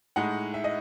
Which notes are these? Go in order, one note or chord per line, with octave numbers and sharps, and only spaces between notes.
A2 G#3 D#4 F#5
E5
D#5